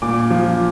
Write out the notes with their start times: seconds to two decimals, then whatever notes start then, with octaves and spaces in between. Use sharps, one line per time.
0.02 A#2 D6
0.30 F3